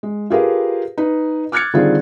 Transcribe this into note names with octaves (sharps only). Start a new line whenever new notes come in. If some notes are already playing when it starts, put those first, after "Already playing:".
G#3
F4 G4 G#4 A#4 B4 F5
D#4 B4
D6 F6 F#6 G#6 A6 C#7
D3 D#3 G3 C4 F4 G#4